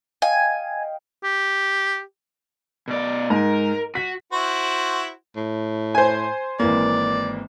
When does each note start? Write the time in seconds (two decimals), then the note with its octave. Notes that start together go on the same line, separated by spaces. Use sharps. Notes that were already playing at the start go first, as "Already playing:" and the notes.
0.22 D#5 F5 G5 G#5
1.24 G4
2.88 B2 D5
3.30 G#2 A#4
3.95 F#4 B6
4.32 E4 F#4 C5
5.36 A2
5.95 C5 G#5
6.59 G#1 E3 A#3 D5